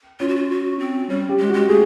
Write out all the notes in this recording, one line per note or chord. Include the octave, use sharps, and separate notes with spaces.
C#4 F4
F#4
F4
F#4
C4
G3 C#4
G4
G#3
F#4
G#3
A3 G#4